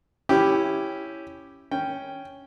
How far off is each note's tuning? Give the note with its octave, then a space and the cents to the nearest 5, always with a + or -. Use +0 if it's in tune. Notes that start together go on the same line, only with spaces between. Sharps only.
C#4 +0 E4 +0 G4 +0
C#4 +0 G5 +0